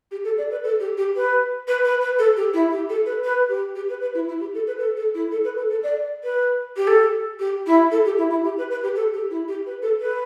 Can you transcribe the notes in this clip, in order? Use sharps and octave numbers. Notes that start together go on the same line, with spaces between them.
G4
A4
D5
B4
A4
G4
G4
B4
B4
B4
B4
A4
G4
E4
G4
A4
B4
B4
G4
G4
B4
B4
E4
E4
G4
A4
B4
A4
A4
E4
A4
B4
A4
A4
D5
B4
G4
A4
G4
E4
A4
G4
E4
E4
G4
B4
B4
G4
A4
G4
E4
G4
B4
A4
B4